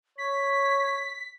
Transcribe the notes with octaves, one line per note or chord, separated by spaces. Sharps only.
C#5 B6